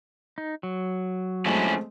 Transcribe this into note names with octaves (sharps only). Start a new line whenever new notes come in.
D#4
F#3
F3 G#3 A3 C4 C#4 E4